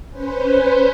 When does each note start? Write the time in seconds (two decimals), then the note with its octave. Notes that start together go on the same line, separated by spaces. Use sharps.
0.10 C#4 B4 C5